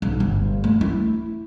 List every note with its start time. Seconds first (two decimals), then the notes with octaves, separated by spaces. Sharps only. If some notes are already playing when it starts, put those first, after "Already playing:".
0.02 B1
0.20 G1
0.64 A3
0.81 E4